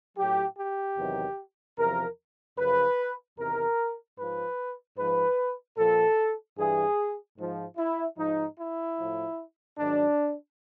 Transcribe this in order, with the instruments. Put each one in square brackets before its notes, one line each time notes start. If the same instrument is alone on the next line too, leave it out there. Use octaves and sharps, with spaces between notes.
[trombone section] A2 F#3 G4
G4
E2 C3 D#3 F#3
E2 C3 F3 A#4
F#2 C#3 F3 B4
E2 C3 D#3 A#4
G#2 F3 B4
G#2 F3 B4
A#2 F3 A4
G2 E3 G#4
G#2 F3
E4
G#2 F3 D#4
E4
A2 F3
G#2 D#3 F#3 D4